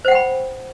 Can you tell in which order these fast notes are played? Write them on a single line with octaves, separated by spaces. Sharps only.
C5 F#5 G5 B5